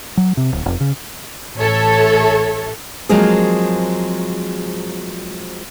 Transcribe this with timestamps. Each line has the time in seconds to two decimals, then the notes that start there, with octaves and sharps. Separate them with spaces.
0.17 F#3
0.37 C3
0.52 D1
0.66 F1
0.80 C#3
1.58 A1 A4 C#5 E5
3.09 F3 F#3 G#3 A#3 C4 G#4